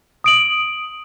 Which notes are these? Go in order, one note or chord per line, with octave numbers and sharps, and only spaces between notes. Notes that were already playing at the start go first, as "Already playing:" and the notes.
D#6 D7 F#7